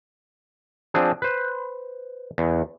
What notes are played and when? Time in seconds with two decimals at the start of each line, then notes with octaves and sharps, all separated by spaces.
0.94 F3 C4 D4 G#4
1.22 B4 C5
2.38 E2